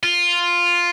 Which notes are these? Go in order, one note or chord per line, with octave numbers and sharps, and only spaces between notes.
F4